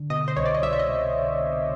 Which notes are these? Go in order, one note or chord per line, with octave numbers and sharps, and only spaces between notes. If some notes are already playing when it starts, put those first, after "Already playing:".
Already playing: D3
B2 D#5
C5
C2 C#5
D5
D#5
C2 E5
E5
D#5